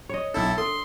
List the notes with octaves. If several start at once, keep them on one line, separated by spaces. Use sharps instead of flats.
C#5 D#5
B1 D4 E4 A4 E6
A4 C6